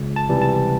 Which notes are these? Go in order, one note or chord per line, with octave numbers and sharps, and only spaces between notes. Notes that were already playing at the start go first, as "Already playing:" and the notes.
Already playing: C#2
A5
C3 E3 G3
A5